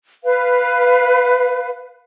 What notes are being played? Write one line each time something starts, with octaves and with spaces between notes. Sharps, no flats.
B4 F5